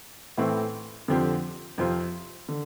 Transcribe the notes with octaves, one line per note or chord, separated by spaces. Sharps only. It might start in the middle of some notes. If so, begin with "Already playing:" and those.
A2 E3 A3 C4
F2 D3 F3 C4 G4
F2 C3 F3 C4 F4
D3